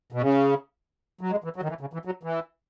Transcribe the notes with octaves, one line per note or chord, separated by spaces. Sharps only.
B2
C#3
F#3
G#3
E3
F#3
D#3
E3
C#3
E3
F#3
E3